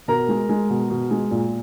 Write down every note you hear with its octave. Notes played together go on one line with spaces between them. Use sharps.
B2 A#4 A#5
G#3
G#3
B2
B2
G#3
A#2